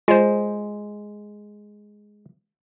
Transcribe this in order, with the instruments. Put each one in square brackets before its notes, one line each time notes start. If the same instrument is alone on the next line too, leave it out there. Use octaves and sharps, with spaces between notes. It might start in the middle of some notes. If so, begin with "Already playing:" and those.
[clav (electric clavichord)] G#3 [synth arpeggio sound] F4 C5